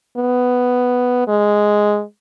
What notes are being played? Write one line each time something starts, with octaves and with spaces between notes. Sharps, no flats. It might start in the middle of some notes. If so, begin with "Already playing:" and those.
B3
G#3